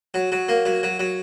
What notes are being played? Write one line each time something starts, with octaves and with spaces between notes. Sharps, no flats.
F#3
F#3
A#3
F#3
F#3
F#3